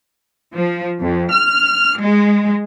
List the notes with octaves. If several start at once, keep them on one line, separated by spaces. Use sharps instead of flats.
F3
F2
F6
G#3